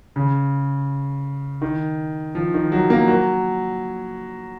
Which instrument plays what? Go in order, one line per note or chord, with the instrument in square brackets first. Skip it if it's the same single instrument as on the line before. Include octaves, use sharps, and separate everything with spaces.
[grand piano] C#3
D#3
F3
D#3
F#3
A#3
F#3